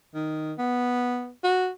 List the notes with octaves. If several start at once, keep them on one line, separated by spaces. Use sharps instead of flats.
D#3
B3
F#4